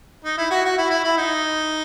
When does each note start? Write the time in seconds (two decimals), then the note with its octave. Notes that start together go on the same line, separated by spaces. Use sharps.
0.25 D#4
0.37 E4
0.51 F#4
0.65 F#4
0.77 E4
0.90 E4
1.04 E4
1.17 D#4